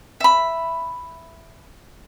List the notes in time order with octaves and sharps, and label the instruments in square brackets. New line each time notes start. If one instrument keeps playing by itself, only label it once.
[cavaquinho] E5 B5